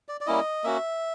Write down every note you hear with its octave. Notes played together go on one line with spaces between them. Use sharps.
D5
D5
G3 A#3 C#4 E4 D#5
A#3 C#4 F#4 E5